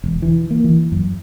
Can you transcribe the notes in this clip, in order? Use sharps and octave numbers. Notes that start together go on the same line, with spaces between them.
E1
E3
A#3
E3
F#2